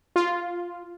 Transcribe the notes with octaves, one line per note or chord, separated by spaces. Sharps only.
F4